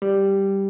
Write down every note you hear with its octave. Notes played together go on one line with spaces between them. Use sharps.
G3